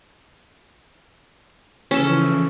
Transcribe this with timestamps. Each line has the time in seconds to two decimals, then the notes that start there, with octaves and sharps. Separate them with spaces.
1.91 C#3 E3 F3 C#4 A4